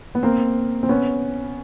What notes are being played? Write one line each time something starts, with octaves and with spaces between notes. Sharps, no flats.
B3
A#3 C4
C4
B3 C#4